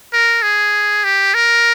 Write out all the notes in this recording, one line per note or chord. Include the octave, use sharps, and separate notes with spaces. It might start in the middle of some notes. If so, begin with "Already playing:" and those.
A#4
G#4
G4
A#4